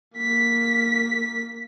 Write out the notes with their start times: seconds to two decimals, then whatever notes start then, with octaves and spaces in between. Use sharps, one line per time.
0.17 A#3 B6